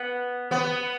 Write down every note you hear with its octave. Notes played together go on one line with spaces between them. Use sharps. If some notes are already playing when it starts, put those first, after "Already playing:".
Already playing: B3
B3